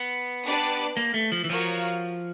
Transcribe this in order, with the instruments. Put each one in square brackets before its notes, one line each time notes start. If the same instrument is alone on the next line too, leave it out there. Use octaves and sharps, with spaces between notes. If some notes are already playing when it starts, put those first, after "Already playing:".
Already playing: [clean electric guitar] B3
[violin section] D4 G4 B4 D5
[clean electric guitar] A#3
A3
F3
E3
[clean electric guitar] F3 [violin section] F#4 A#4 C#5 F5